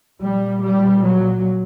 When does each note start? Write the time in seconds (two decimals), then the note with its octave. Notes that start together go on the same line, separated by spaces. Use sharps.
0.21 A#2 G3
0.63 G3
1.05 F#3